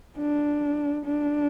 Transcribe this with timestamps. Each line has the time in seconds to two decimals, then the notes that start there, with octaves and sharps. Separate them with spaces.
0.18 D4
1.06 D4